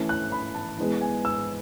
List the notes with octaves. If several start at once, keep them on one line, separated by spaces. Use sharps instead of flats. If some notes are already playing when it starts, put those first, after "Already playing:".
Already playing: E3 A3 C#4
F#6
B5
A5
E3 G#3 B3
G#5
E6